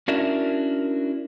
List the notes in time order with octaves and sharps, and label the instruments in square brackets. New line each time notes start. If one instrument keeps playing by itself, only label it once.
[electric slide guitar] C#4 D4 E4 F#4 A#4